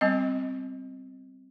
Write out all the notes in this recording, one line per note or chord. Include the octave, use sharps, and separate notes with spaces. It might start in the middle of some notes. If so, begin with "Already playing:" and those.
G3 B3 C4 D#5